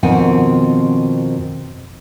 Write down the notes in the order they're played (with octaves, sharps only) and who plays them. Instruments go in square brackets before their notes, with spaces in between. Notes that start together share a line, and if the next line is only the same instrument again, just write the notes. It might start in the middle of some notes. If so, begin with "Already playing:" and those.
[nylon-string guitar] F2 B2 D#3 C4 F#5 G#5